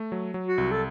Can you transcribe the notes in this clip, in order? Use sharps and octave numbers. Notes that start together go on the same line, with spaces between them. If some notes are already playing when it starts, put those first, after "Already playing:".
Already playing: A3
F#3
F#3
F#4
C2
A4